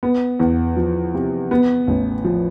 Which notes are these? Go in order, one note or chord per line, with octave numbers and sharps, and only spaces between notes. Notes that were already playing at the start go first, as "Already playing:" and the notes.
B3
E2
F3
C3
B3
A1
F3